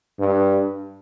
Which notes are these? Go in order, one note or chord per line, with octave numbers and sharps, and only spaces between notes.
G2